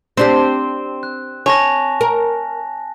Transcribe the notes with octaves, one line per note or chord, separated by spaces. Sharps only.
C4 D4 G4 C5
F#6
C#5 G#5 A5 A#6
A#4